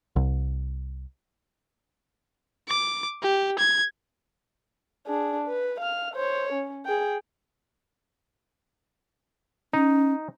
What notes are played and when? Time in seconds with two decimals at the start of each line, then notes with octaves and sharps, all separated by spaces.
0.16 C2
2.69 D6
3.23 G4
3.58 G#6
5.07 D4 G#4
5.48 B4
5.81 F5 F6
6.14 C5 C#5
6.53 C#4
6.85 G#4 G5
9.73 C#4 D#4